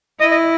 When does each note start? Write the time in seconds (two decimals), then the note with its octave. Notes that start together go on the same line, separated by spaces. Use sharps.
0.20 E4 D#5
0.31 D#5